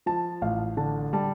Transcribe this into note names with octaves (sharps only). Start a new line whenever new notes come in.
F3 A5
A1 F5
D3 A5
G3 A5